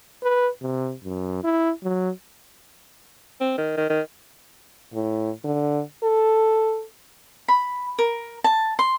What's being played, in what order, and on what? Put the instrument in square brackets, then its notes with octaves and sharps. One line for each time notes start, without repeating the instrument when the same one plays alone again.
[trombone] B4
C3
F#2
E4
F#3
[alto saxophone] C4
D#3
D#3
D#3
[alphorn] A2
D3
A4
[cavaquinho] B5
A#4
A5
C6